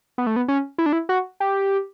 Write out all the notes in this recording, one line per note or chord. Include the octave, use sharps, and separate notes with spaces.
B3
A3
B3
C#4
E4
D4
E4
F#4
G4